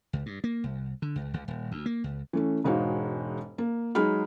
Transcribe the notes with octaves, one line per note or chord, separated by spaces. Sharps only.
C#2
G2
A#3
C2
D3
C#2
C#2
D#1
D2
A#3
C#2
E3 A3 C#4
E1 G#2 G#3 D#4 F#4 F5
A#3
F#3 G#3 D#4 G#4 B5 F6